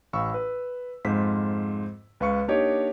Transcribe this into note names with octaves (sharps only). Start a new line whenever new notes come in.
A1 F5 B5 C#6 E6
B4
F2 G#2 F4 C5 B6
C#2 B4 F5 C#6 C#7
A#3 D4 D#4 G4 C#5 D#5